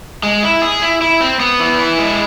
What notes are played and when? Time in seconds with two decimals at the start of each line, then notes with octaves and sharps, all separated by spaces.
0.23 G#3
0.43 E4
0.62 G#4
0.82 E4
1.01 E4
1.21 C4
1.40 B3
1.60 E3
1.79 E4
1.99 G#3